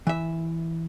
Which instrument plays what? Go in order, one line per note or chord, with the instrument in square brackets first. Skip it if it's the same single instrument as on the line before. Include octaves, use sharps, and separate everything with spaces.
[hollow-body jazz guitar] E3 E5